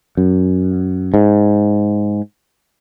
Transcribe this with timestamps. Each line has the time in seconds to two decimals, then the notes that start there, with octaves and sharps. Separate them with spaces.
0.17 F#2
1.14 G#2